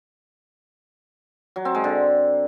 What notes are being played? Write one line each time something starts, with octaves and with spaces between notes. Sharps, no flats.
F#3
C4
G#3
D3